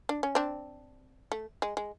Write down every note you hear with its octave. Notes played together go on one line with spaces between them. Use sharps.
D4
C#4
C4 D4
A3
G#3
G#3